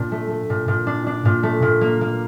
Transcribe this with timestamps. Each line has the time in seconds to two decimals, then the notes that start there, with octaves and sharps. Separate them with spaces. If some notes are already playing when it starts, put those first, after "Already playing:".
Already playing: A#2 D4
0.12 A3
0.30 A3
0.50 A#2
0.68 A#2
0.87 D4
1.06 D4
1.25 A#2
1.43 A3
1.62 A#2
1.81 A#3
2.01 A#3